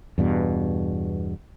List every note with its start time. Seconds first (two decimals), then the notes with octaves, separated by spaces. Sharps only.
0.18 E2 G2 B2